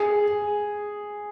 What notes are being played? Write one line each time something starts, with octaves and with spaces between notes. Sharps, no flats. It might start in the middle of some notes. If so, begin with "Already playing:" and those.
Already playing: G#4